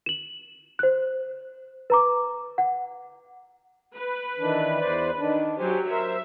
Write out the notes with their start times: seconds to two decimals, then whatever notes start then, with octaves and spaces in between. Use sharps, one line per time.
0.06 E7 F#7
0.79 C5 F#6
1.90 B4 A#5 D6
2.58 F#5
3.96 B4
4.39 D#3 E3 D4
4.80 E2 C5 D5
5.18 D#3 D4
5.59 F#3 G4 C5 G#5
5.90 A#4 C5 E5